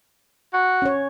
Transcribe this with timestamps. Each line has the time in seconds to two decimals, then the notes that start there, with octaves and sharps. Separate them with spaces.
0.53 F#4
0.82 C#4 C#5